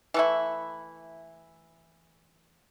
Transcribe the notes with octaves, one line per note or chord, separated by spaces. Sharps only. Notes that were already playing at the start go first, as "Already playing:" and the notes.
E3 A3 E4